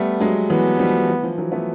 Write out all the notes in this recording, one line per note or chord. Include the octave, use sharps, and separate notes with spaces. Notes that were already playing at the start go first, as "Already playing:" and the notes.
Already playing: G3 A3 B3
F#3 G#3
E3 F#3 B3
F3 G3
E3
F3
E3 F#3
A3 B3